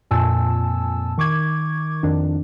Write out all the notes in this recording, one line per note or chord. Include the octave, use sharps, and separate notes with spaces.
F2 A#2 G#5 A5 E6
D#3 C#6 D6 G#6
F2 D#3 D4